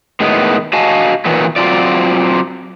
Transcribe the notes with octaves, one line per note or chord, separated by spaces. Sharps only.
A2 D#3 G#3 B3
F#4 D#5 F5 G#5 A5
A#2 D#3 E3 F#3 B3
F#3 C4 F4 D5